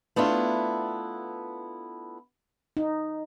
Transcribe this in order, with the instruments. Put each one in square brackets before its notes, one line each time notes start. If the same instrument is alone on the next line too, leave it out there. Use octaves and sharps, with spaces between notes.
[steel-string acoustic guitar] A3 B3 D4 E4 F4
[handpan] D#4